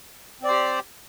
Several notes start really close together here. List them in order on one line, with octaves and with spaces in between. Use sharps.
C4 D5 C5 G4